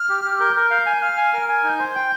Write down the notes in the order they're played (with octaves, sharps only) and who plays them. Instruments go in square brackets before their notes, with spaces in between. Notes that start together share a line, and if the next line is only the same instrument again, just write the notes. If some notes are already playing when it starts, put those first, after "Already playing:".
Already playing: [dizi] F6
[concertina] G4
G4
[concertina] A#4 [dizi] G6
[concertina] A#4
[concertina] F5 [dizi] G6
[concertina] G#5
[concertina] F5 [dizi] F6
[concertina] G#5
[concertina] A#4 [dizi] F6
[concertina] G#5 [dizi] G#6
[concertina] D#4 [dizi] G#6
[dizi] G6
[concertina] C5
G5